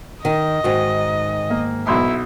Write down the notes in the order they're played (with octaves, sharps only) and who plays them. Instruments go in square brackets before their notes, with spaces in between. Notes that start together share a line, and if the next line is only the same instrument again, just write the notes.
[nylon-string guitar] D#3 [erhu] D#5
[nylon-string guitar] G#2 D#3 [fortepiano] F#4
[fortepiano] A#3
[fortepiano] B1 C6 [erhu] E4